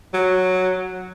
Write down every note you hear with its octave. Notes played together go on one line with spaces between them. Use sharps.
F#3